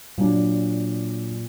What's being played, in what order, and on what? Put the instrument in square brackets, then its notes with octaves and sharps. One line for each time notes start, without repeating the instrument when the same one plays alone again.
[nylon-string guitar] A#2 [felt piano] F#3 D4